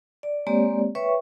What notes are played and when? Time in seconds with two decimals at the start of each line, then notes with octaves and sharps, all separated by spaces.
0.23 D5
0.47 G#3 A#3 C4 G4 C#5 D5
0.95 B4 C#5 E5 G5 C#6